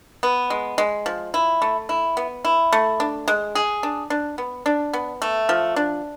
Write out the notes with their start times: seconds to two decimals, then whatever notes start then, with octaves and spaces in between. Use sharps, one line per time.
0.23 B3
0.50 G#3
0.78 G#3
1.06 F3
1.34 E4
1.62 A3
1.89 E4
2.17 B3
2.45 E4
2.73 A3
3.00 D4
3.28 G#3
3.55 G#4
3.83 D4
4.10 D4
4.38 B3
4.66 D4
4.93 B3
5.22 A3
5.49 F3
5.76 D4